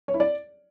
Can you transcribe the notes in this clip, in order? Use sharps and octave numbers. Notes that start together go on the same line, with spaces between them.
C#5
E4
D5